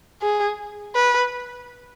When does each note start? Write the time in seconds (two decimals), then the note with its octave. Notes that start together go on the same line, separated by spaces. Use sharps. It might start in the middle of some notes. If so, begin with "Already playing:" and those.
0.22 G#4
0.95 B4